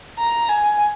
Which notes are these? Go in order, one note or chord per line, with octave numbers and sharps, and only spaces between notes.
A#5
G#5